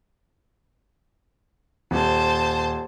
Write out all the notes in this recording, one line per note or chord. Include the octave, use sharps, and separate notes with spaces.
D#1 C5 A5